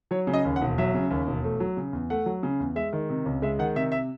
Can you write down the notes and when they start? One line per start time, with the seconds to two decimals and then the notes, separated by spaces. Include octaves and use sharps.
0.11 F#3 C#5
0.27 C#3
0.33 D#5
0.45 D#2
0.56 F#5
0.62 E1
0.78 F#3 E5
0.95 C#3
1.11 D#2
1.28 E1
1.44 A3
1.60 F#3
1.77 C#3
1.93 E2
2.10 A3 F#5
2.26 F#3
2.43 C#3
2.60 E2
2.76 G#3 E5
2.93 D#3
3.10 C3
3.26 C#2
3.42 G#3 E5
3.59 D#3 F#5
3.76 C3 E5
3.92 E5